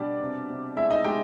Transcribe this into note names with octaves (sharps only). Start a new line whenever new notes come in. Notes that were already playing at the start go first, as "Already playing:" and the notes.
Already playing: B2 G3 D4 D5
C3
C3
G#3 E4 E5
D#4 D#5
G#3 G4 G5